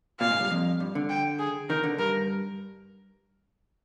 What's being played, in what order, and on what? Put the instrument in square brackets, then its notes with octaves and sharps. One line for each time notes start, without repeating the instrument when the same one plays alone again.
[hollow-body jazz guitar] A#2 [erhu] F5
[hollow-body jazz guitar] G#2
G2
F2
G2
D3
[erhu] G5
G#4
[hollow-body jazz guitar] D#3 [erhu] A#4
[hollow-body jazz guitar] D3
[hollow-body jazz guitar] G2 [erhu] A#4